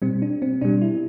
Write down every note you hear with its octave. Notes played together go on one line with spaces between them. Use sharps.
B2 G3 C4
D4
C4
B2 G3 D4
E4